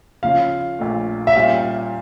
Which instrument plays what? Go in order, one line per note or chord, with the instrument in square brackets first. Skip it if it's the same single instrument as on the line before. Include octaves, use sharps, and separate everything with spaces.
[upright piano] C#3 F3 C#4 [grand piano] F5
[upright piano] A#1 A#2 A3
[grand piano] E5
[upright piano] A#2 G3 C#4 G4 [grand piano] F5